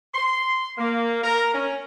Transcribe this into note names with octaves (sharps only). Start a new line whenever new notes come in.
C6
A#3
A#4
C#4